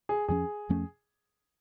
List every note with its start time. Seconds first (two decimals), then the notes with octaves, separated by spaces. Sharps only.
0.09 G#4
0.28 F2 F3 A3 C#4 G#4
0.69 F2 F3 A3 C#4